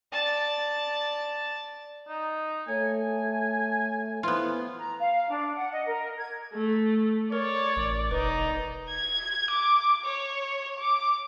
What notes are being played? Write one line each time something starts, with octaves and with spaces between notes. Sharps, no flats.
D5 A5
D#4
A3 C#5 G#5
E3 B3 F4
A#5
F5
D4
F#5
D#5
A#4
G#6
A3
A#4 C#5 D5
A1
E1 D#4 B4
G#6
D6
C#5
D6